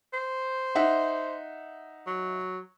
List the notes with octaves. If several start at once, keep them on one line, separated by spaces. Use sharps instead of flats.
C5
D#4 E5 F#5
F#3